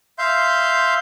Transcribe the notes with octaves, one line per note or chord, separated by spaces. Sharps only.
E5 F5 C6 G6